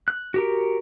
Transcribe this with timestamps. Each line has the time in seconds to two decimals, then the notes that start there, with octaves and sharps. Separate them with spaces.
0.08 F#6
0.34 F#4 G4 A#4